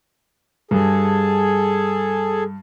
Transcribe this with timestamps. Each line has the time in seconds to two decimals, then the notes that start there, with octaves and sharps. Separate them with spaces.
0.71 G2 G#4 A4